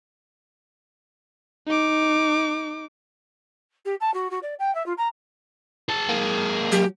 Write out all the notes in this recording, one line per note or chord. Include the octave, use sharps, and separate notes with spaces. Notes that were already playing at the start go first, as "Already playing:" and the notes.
D#4 D6
G4
A5
F#4
F#4
D5
G5
E5
F4
A#5
G#4 A5
G#3 A#3
F#3 G4